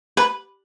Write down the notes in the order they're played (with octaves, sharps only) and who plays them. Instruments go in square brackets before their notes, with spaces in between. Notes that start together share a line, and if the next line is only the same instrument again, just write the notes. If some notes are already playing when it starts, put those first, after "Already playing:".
[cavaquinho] B4